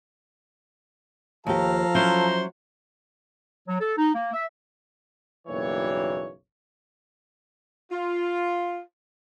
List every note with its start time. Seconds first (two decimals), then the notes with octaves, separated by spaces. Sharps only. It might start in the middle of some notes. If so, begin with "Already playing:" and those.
1.47 D#2 F3 G4 A4 F5 A#5
1.95 F#3 C#4 E4 C5
3.68 F#3
3.81 A4
3.97 D#4
4.14 A#3
4.34 E5
5.48 F#1 B1 E3 G3 A#3 C#5
7.91 F4